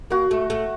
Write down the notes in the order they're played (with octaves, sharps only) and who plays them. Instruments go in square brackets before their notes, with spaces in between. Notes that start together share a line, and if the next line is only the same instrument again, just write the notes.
[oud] A#3 [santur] F#4
[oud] A3
A3